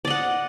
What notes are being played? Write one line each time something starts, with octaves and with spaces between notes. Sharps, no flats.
D5 D#5 F#5